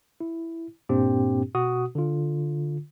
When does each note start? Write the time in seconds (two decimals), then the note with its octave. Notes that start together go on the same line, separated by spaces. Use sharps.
0.21 E4
0.89 G2 A#2 A#3 C4 D4 G4
1.55 B2 F#4 D#6
1.95 D3 F4